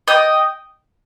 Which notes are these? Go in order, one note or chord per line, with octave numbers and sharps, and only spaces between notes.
D#5 G5